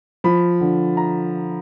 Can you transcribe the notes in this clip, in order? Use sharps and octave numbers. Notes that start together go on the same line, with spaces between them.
F3 B5
D3
A#5